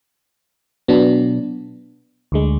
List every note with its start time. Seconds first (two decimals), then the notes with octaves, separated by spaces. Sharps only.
0.88 B2 F#3 B3 D4
2.32 D2 D3 G#3